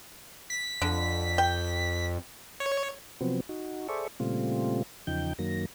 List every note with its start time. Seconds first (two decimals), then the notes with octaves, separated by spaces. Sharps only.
0.50 B6
0.82 F2 D3
1.38 G5
2.60 C#5
3.21 C3 F3 F#3 B3 C4
3.49 D#4 F#4
3.88 G#4 A4 C5 D5 E5 C#6
4.20 A#2 C#3 G3 A3 C4 F4
5.07 E2 C#3 F3 D#4 G5 G6
5.39 F#2 D#3 F#3 A#3 A#6